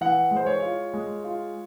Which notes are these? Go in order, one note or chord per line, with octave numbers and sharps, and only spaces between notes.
E3 F#5
G#3
C5
C#5
F4
G#3
F4